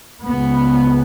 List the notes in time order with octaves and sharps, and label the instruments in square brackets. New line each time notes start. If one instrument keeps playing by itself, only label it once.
[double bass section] C#2 C#3 B3